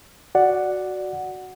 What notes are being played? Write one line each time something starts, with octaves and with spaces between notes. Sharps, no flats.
F#4 D5 F#5